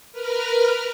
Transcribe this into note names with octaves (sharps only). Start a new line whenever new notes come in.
A#4 B4 F6